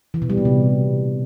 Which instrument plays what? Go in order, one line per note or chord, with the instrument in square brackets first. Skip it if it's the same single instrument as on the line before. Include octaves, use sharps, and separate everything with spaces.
[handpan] E3
B2
G3
A#2
C3